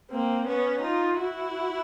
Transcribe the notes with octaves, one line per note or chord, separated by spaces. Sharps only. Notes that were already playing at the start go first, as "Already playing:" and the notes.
A#3 C4
B3 C#4
D#4 F4
E4 F#4